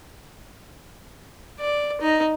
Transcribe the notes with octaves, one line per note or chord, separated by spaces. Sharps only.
D5
D#4